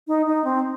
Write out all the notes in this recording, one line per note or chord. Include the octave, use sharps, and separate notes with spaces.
D#4
D#4
C4